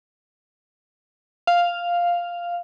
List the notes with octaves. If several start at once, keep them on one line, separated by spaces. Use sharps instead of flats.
F5